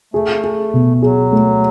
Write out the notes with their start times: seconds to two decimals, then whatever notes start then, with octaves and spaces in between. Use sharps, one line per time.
0.14 A3 G#4
0.44 G#4
0.73 B2
1.02 F#3 G#4
1.32 A3